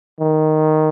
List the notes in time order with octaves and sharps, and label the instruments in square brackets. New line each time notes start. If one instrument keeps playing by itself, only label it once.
[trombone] D#3